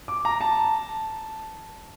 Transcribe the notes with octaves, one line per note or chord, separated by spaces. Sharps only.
D6
A#5
A5